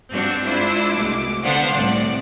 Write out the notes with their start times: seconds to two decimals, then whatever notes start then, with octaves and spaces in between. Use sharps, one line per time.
0.11 G2 C4 D4 F#4
0.44 G#3 D4 E4 F4 C5
0.91 C2 B2 G#3 A3 D6
1.44 D3 B3 D4 C5 F5 F#5
1.73 C2 A2 D5